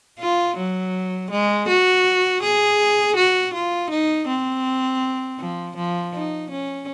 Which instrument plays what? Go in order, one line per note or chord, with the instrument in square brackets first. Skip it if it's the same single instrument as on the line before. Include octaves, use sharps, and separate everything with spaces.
[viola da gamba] F4
F#3
G#3
F#4
G#4
F#4
F4
D#4
C4
F3
F3
D#4
C#4